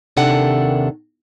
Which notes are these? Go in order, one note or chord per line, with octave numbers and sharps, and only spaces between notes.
D#2 C3 D#3 D4 A4 F#5